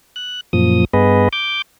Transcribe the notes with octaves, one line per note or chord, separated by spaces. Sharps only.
F#6
F#2 A#2 F3 D#6
G2 B3 G#4 B4 D#5
D6 G6